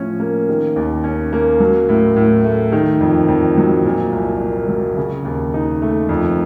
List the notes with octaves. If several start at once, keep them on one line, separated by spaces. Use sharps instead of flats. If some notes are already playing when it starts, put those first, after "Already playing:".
Already playing: A2 F3 C#4
A#3
D#3
D#2
C#4
A#3
F#3
A2
A2
A3
D#3
F2
F2
F#3
A#2
C2
A#3
F#3
C#3
D#2
D#4
A3
F2